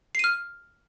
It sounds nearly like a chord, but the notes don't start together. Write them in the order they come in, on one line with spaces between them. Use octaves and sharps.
C7 D#7 F6